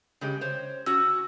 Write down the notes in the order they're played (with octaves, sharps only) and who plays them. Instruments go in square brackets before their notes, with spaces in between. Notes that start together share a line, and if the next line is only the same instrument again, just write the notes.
[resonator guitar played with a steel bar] C#3 G#3 G4
C5 C#5
[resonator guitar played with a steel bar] C#4 F#4 [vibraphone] E6